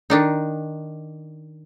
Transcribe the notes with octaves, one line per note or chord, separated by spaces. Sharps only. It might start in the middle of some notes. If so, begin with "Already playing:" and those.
D#3 D4 D#4